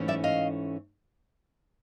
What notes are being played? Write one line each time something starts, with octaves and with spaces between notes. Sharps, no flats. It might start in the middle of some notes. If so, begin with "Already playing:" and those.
Already playing: G#2 E3 A3 C#4
D5 E5
D#5 F5